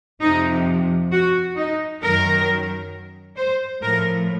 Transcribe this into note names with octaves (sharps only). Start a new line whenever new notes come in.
F2 C3 F3 D#4
F#4
D#4
F#2 D#3 F#3 A#4
C5
A2 F3 A#4